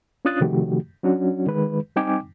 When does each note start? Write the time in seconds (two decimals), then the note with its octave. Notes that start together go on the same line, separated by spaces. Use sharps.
0.25 C#4 D4 F4 D#6 F#6 A6
0.41 C3 D#3 F3 A3 F#4 G4
1.03 F#3 C#4 D4 F#4
1.47 D#3 G#3 B4
1.96 G3 C4 D#4 G5 G#5 D6